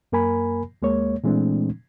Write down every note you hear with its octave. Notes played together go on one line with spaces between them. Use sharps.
F#2 A#3 A#4 G#5 B5
D#2 G#3 A#3 C#5
A#2 E3 G#3 A3 C4 D4